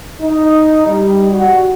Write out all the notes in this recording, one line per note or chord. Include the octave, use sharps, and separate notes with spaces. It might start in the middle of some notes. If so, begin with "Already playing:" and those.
D#4
G3
F#4